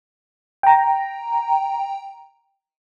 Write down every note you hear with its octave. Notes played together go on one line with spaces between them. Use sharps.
G5 A#5